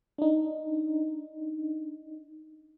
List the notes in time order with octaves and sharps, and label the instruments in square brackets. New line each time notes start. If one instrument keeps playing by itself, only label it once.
[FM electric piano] D4 D#4